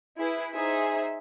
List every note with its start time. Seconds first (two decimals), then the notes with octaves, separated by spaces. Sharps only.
0.18 E4 G#4 B4
0.54 D#4 G#4 C5 E5